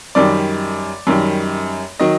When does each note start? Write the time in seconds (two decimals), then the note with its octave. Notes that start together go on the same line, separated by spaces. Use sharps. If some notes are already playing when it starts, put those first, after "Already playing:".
0.15 F#2 D#3 G3 D5
1.07 F#2 D#3 G3
2.00 D#3 F#3 D#5